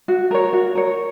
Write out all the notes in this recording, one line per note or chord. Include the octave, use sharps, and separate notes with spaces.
F#4
A#4 C#5
F#4
A#4 C#5